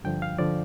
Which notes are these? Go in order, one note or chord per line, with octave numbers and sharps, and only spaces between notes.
G2 D3 F3 G5
F5
D3 F3 D5